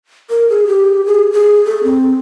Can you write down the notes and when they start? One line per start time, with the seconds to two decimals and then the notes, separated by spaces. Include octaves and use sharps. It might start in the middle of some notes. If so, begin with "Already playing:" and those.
0.30 A#4
0.50 G#4
0.67 G4
1.06 G#4
1.32 G#4
1.66 A4
1.83 C4